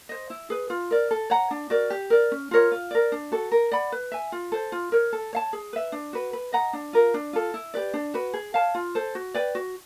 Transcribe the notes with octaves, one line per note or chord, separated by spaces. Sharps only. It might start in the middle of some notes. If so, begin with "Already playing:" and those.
C5 D#5
E4
G#4 B4
F4
A#4 D5
A4
C#5 F#5 A#5
D4
F#4 A#4 D5
G4
A#4 D5
C#4
F4 A#4 C#5
F4
A#4 D5
D4
F#4 A4
A#4
D5 F#5 B5
B4
E5 G#5
F4
A4 C5
F4
A#4 C#5
A4
C#5 F5 A5
G#4
B4 E5
D4
F#4 B4
B4
D#5 F#5 A#5
D4
F4 A#4
D4
F4 A4
E4
G4 B4 D5
D4
F#4 B4
G#4
C#5 F5 A5
F4
A4 C5
F#4
B4 D5 G5
F#4